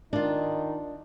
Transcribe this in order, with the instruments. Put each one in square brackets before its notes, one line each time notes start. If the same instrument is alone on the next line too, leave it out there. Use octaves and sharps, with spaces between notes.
[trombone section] D#3 D#4 [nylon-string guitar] D4 F4